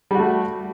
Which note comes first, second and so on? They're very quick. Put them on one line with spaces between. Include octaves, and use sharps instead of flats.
G3 F#4 A3